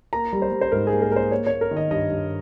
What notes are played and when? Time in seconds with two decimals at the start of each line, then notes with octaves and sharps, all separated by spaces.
0.13 A#3 A#5
0.33 G3
0.42 C5
0.52 G3
0.61 C5
0.72 G#2 A#4
0.87 G#4
0.92 A#3
1.01 A#4
1.12 A#3 A#4 C5
1.31 A#3 C#5
1.47 A#3 C#5
1.61 A#4
1.71 D#3
1.77 D#5
1.91 G2 D#5
2.10 G2